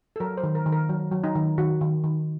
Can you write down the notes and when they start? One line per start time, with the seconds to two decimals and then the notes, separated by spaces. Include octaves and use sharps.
0.16 A4
0.20 F#3 A#4
0.37 C5
0.43 D#3
0.55 A#4
0.66 D#3
0.72 A#4
0.89 F#3
1.12 F#3
1.24 D#4
1.35 D#3
1.58 D#3 F#4
1.81 D#3
2.04 D#3